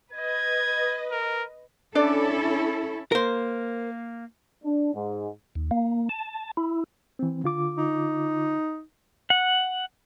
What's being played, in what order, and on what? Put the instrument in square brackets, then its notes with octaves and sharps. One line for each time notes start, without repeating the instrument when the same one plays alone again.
[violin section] B4 D#5 [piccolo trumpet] G#6
[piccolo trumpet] A#4
[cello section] C#4 E4 A4 [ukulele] D4 D5
[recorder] A#3 [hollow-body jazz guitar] A#4 C5
[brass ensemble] D4
G#2
[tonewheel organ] D#2
A#3
A5
E4
[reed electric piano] E3 C4
D3 F4 D6
[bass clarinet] D#4
[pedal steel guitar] F#5